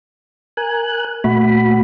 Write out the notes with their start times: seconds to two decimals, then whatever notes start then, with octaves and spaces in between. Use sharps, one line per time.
0.57 A#4 G#5 F#6
1.24 A#2 A3 F#4 B5